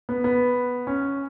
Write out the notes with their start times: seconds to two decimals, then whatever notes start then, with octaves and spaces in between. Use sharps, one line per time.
0.09 B3
0.24 B3
0.87 C#4